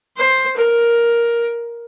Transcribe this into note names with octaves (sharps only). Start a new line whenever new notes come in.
C5
A#4